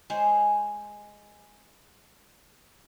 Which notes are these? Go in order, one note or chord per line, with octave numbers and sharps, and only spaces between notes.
G#3 G#4 C5 C#5